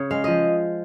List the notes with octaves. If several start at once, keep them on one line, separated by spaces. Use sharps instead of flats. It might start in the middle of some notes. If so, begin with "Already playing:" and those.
Already playing: C#3 C#5
G#3 F5
F3 D#5